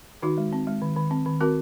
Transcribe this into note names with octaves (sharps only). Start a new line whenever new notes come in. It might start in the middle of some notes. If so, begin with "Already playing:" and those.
D#3 D#4 F#4
G#3
C4
G#3
D#3
D#3
C4
D#3
C4 F#4 A#4